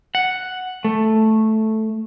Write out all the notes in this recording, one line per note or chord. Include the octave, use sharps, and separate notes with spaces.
F#5
A3